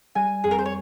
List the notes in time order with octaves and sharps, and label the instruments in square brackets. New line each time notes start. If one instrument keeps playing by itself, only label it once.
[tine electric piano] G3 [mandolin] G#5
[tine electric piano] F2 [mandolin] G#4
[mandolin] A#4
C5
C#5